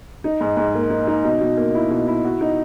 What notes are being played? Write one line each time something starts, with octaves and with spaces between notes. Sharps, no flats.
D#4
G#2
G#2
A#3
D#4
D#4
B2
B2
A#3
E4
B2
E4
F#4
D#4